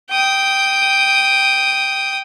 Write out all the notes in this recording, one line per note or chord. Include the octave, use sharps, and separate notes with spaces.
G5 D#6